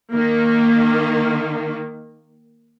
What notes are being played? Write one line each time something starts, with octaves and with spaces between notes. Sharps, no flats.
D#3 A#3